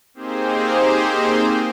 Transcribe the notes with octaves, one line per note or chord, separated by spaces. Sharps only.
A#3 C4 D#4 G4 G#4 C5